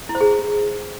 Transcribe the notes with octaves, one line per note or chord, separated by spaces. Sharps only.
E4
C5
G#4